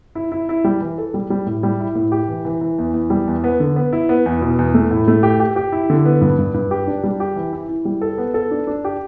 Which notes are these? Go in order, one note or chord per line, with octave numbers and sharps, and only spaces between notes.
E4
E4
E4
G3
E3
A4
G3
G3
A2
G3
E4
A2
G4
E3
E3
E3
E2
E2
G3
E2
B3
D3
B3
E4
B3
E2
B2
E2
A3
A2
A3
G4
G4
G4
E4
D3
B3
G2
G2
G2
G4
D4
G3
G4
E3
E4
E4
G3
A4
B3
A4
D4
D4
G4